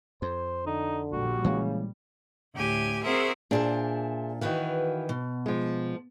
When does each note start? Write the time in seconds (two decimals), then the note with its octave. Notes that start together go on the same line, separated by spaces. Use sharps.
0.22 F2 C5
0.66 D3 D#4
1.13 A#1 G3 F#4
1.44 C#3 E3 G#3 A#3
2.54 D2 A2 G4 G#5
3.03 C4 F#4 G#4 A#4 C5 E5
3.51 A#2 D4 G#4 C5 E5
4.41 D#3 E3 F#4 B4 F5
5.09 B2
5.46 F3 G#3